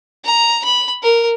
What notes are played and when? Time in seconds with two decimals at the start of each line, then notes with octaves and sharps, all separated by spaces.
0.25 A#5
0.65 B5
1.03 A#4